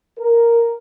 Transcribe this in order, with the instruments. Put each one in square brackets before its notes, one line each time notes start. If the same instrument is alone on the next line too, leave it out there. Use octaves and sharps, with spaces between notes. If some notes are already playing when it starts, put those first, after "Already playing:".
[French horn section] A#4